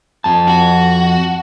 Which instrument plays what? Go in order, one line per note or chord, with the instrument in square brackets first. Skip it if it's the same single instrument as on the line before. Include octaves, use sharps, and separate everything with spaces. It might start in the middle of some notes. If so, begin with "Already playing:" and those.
[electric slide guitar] F2 A5
[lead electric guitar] F#4